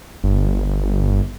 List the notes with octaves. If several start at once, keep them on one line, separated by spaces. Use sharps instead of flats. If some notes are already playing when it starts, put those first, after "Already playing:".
G1